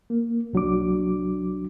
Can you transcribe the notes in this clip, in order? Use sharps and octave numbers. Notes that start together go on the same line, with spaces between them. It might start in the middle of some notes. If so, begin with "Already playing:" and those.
A#3
C2 F#3 D4 D6